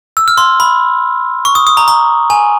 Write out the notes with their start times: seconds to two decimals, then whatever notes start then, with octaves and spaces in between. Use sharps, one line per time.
0.17 E6
0.28 F6
0.38 C6
0.60 B5
1.45 C#6
1.55 D#6
1.67 D#6
1.77 A#5
1.88 A#5
2.30 G#5